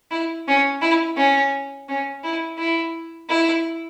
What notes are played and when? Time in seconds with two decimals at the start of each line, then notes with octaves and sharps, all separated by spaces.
0.11 E4
0.47 C#4
0.82 E4
1.17 C#4
1.89 C#4
2.24 E4
2.58 E4
3.29 E4